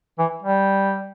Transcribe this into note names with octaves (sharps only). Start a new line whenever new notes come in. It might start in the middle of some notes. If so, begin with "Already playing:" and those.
E3
G3